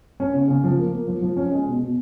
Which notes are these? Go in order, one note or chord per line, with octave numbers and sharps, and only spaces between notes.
C#4
C#3
C#3
F3
A#3
A#3
F3
F3
C#4
G#3
B2
B2